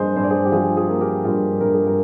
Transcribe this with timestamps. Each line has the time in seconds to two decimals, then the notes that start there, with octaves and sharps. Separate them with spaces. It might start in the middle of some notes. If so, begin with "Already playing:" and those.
Already playing: G2 F3 A#3 G#4 C5 D#5
0.16 G2 C5
0.23 D5
0.30 G#4 C5
0.45 G4
0.52 F3 F4 G#4
0.76 F4 G#4
0.88 A#3
1.01 G4 A#4
1.24 G2 F4 G#4
1.61 G2 A#4
1.74 G#4
1.86 G4 A#4